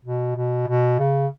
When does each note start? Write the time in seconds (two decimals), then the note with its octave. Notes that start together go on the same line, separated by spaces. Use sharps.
0.05 B2
0.36 B2
0.67 B2
0.99 C#3